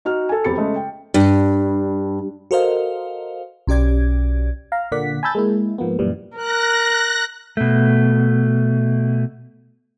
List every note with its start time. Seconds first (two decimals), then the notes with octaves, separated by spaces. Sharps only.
0.05 D#4 F#4 F6
0.29 A4 G#5
0.44 E1 F2 G4 B5 A6 C#7
0.57 C#3 G#3 A3
0.76 G5
1.14 G2
2.51 F#4 A4 A#4 C5 D#5 F5
3.67 B1 C#4 G4 D5 G#6
4.72 F5 A#5
4.92 A#2 D3 A#3 D5 F#5 B6
5.23 G#5 A5 B5 E6 G6 A6
5.35 G#3 A#3 E4
5.78 G#2 F3 A#3 B3
5.99 F#2 A#2 E3 G3
6.37 A#4 F#6 A#6
7.57 B2 A3